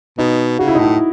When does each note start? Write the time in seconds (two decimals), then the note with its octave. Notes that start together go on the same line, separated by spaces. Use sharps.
0.18 B2 D#4
0.59 C#3 F#4
0.68 E4
0.75 D#4
0.79 A2 E4